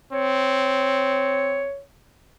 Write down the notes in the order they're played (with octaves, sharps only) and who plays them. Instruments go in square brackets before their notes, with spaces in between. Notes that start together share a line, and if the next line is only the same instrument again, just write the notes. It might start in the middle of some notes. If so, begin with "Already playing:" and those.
[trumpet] C4 [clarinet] C#5